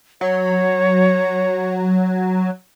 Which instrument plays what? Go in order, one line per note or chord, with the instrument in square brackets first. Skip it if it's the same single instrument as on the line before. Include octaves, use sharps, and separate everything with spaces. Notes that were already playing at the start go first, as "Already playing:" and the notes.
[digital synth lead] F#3 [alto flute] C#5